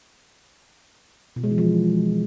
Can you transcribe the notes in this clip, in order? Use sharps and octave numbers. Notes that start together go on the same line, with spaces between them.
B2
G#3
E3
F3